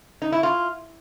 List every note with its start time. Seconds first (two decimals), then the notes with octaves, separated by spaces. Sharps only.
0.22 D#4
0.32 E4
0.43 F4